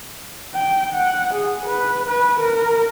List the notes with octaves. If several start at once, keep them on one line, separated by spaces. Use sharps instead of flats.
G5
F#5
G#4
B4
B4
A#4